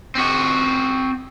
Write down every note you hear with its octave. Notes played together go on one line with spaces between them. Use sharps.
C4 F#4